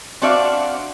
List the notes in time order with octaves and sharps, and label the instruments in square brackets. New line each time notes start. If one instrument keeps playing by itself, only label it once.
[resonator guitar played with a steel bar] C4 D4 F#4 D5 E5 F5